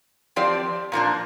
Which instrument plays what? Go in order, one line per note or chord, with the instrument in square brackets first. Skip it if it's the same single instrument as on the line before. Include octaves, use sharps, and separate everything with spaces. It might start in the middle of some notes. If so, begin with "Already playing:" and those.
[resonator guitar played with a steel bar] F3 C4 G4 D5
A#2 F3 A#3 D4